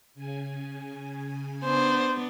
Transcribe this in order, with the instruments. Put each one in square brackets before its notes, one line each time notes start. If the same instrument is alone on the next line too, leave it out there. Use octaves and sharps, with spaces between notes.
[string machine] C#3 G#5
[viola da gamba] B3 D4 [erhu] C5